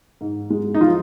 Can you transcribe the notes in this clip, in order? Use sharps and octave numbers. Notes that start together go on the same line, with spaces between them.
G#2
G#3
D#4
F3 F4